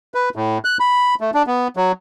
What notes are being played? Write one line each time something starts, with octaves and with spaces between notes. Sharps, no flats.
B4
A2
F#6
B5
A3
D4
B3
F#3